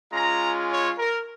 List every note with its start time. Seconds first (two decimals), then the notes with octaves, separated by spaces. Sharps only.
0.12 G#3 C#4 F4 A#5
0.69 C#5
0.98 A#4